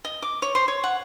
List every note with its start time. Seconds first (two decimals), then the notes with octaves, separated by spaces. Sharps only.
0.05 D#5
0.22 D6
0.42 C#5
0.55 C5
0.68 C#5
0.84 F#5